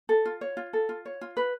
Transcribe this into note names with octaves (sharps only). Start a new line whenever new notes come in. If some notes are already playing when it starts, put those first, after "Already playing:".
A4
F4
C#5
F4
A4
F4
C#5
F4
B4